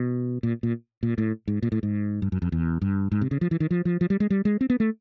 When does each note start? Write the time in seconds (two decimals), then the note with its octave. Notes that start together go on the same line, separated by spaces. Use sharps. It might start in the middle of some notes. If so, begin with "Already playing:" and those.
Already playing: B2
0.43 A#2
0.63 A#2
1.03 A#2
1.18 A2
1.48 G#2
1.63 A#2
1.72 A2
1.83 G#2
2.22 G2
2.32 F#2
2.42 F2
2.52 E2
2.82 G2
3.12 G#2
3.21 C3
3.31 C#3
3.41 F3
3.51 E3
3.60 D#3
3.71 F3
3.85 F3
4.01 F3
4.10 G3
4.20 G#3
4.30 G3
4.45 G#3
4.61 C4
4.70 B3
4.80 A3